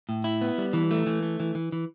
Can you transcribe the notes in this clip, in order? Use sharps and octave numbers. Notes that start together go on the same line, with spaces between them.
A2
E4
B3
G3
E3
A3
E3
A3
E3
E3
E3